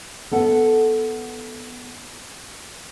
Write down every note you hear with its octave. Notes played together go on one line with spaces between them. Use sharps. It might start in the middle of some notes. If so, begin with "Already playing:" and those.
B3 A4 F#5